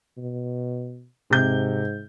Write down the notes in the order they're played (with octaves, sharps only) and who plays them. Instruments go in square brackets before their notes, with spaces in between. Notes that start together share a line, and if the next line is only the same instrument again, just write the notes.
[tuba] B2
[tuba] G#2 [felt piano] C3 G6